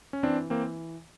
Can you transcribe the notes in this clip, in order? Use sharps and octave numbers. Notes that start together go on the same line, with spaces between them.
C#4
E3 C4 D4
E3 A#3 C4